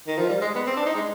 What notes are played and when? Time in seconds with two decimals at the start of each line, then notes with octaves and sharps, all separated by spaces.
0.07 D#3
0.18 F3
0.29 G3
0.41 G#3
0.55 B3
0.67 C4
0.77 D4
0.86 D#4
0.95 G#3